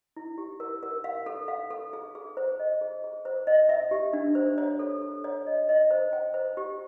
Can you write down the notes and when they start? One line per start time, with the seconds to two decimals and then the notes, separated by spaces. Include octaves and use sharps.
0.17 E4
0.38 G4
0.60 A#4
0.83 A#4
1.04 F5
1.26 A4
1.48 F5
1.71 A4
1.93 G#4
2.15 G#4
2.37 C5
2.59 D#5
2.81 G#4
3.04 G#4
3.25 C5
3.47 D#5
3.69 E5
3.91 G4
4.13 D4
4.35 C5
4.58 C#5
4.79 A4
5.02 A4
5.24 C#5
5.47 D#5
5.69 D#5
5.91 C5
6.13 G5
6.34 C5
6.57 G4